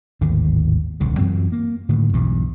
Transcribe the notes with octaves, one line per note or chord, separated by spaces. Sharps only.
G#1 D#2 A2 D3
D#1 C2 D3
F#2 E3 C4
A#3
A2 D3 D#3
B1 E2 G2